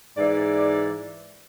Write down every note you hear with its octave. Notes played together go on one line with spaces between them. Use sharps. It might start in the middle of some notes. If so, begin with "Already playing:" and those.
G#2 E3 D5